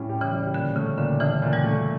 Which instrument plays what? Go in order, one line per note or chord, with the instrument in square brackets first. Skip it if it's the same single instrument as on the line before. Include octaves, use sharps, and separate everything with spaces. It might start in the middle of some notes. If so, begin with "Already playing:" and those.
Already playing: [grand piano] A2 G3 C#4
G4
[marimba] C#3 E3
[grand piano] G3
[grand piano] A#2 [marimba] D3
[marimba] C#3 [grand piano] A3
[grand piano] A#2 [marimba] D3
[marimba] C#3 E3 [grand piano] D4
[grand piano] A#2
[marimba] E3 G3
[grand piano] A3